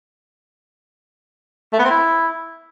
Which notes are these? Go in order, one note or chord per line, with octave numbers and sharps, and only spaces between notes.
A3
B3
C4
E4